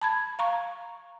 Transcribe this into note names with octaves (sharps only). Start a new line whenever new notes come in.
A5 B5 G#6
F5 A#5 C#6